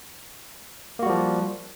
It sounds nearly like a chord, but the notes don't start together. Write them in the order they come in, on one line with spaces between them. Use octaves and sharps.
A#3 F#4 G3 F3